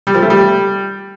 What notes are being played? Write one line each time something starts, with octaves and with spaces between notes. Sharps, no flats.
G3
F3
A3
G3